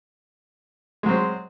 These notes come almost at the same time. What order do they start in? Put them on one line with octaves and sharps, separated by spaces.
G#3 F#3 C4